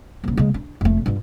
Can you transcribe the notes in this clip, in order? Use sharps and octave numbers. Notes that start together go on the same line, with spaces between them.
D#1 C#3
C#3 G#3
D4
F1 A3
G2 F4